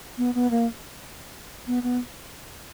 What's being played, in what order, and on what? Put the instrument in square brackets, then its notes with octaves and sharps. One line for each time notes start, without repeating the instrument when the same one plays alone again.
[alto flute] B3
B3
A#3
B3
B3